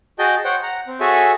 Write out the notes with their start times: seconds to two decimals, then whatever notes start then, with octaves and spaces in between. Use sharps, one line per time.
0.19 F#4 G#4 D#5 G5 A5 G6
0.45 C5 C#5 F#5 G5
0.63 F#5 A#5
0.87 C4
1.00 F#4 G#4 A4 C#5 E5 G#5